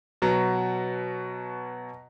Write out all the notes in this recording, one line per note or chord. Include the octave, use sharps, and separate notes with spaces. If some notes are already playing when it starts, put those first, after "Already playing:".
B2 F#3